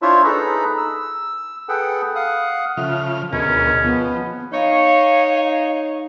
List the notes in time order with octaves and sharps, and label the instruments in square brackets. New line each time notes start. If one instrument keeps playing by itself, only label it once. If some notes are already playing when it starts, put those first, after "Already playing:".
[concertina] D4 E4 F4 C5 C#5 E5
D#4 G#4 A4 B4 A#5 B5
E6
G#4 A4 B4 F#5 G5
F5 F#5 D#6
[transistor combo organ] C#3 F3 F6 [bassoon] A3
[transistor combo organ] D2 B2 A#4 [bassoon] G#3 [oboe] C#4
[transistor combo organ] F3 [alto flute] B3
[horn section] D#4 C#5 [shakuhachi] F5